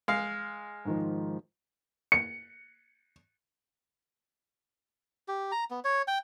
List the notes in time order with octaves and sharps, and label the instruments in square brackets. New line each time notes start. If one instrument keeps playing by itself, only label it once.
[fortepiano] G#3 F5
[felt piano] G#2 D#3 F3
[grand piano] C#7
[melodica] G4
A#5
B3
C#5
G5